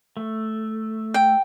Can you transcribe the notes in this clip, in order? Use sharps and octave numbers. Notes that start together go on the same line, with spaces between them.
A3
G5